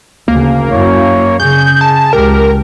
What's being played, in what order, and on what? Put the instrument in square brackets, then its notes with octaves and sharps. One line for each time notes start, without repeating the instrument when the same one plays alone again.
[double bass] D2 C#3 [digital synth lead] A#3
[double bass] F#2 E4 [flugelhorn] C#5
[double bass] C#3 [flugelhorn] G#4 [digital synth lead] G6
[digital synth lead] A5
[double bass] C#2 [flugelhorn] G4 [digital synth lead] A#4